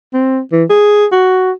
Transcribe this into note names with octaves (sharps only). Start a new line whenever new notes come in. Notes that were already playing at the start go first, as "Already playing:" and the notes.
C4
E3
G#4
F#4